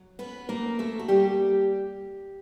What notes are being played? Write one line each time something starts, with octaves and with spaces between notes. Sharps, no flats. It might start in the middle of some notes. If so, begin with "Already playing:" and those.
Already playing: F#3
B3 C#4 B4
A3 A#3 A#4
B2 A3 A4
F#4
G3 A#3 G4